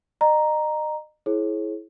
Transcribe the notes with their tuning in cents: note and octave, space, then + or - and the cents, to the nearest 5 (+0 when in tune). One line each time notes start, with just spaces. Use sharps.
D#5 -35 A#5 +0
E4 +0 G#4 +30 C#5 -40